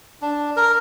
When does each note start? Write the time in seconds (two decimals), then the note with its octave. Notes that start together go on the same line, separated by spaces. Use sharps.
0.22 D4
0.56 A#4